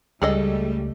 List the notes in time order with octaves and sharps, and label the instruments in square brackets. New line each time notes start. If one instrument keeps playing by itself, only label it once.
[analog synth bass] C#2 [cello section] G3 A3 [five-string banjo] G#4 A4 D#5